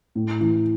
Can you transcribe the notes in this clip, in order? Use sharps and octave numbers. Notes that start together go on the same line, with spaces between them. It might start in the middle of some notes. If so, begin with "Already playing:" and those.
A2
E3